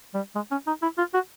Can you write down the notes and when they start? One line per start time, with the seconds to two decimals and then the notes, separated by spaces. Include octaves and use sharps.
0.14 G3
0.35 G#3
0.51 C#4
0.67 D#4
0.82 E4
0.98 F4
1.14 F#4